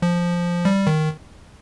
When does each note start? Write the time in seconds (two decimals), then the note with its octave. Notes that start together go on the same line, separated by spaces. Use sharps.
0.02 F3
0.65 G3
0.87 D#3